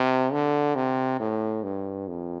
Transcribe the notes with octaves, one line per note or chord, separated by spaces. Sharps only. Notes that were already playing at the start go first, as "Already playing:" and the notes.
Already playing: C3
D3
C3
A2
G2
F2